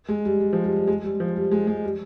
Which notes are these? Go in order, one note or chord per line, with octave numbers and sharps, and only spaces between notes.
G#3
G3
G3
F3
G3
G3
G#3
G3
F3
G3
G#3
G#3
G3